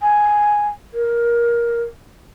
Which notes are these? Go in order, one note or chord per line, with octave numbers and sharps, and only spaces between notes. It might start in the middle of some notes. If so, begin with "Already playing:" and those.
G#5
A#4